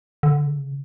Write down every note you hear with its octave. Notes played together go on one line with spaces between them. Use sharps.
D3
C#3